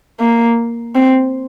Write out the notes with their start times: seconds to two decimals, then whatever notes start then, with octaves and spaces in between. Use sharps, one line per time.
0.20 A#3
0.95 C4